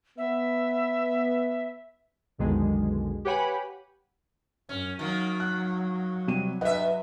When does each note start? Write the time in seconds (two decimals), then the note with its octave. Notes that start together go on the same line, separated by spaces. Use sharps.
0.18 B3 E5
2.38 B1 F2 B2 D3 D#3 G#3
3.25 G4 B4 C#5 F#5 G#5 B5
4.69 F#2 C#4
4.99 D#3 F#3 A#3
5.40 F#6
6.27 C3 G3 D#7
6.61 G2 B4 D#5 E5 F#5